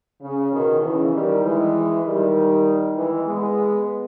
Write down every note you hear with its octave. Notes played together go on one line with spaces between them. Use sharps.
C#3
B2 D#3
C#3 E3
D#3 G3
E3 G#3
D#3 G3
E3 G#3
G#3 B3